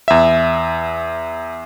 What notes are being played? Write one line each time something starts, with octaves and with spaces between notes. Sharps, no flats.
E2 E5